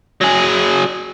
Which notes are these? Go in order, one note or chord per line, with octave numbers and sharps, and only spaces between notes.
F#3 G#4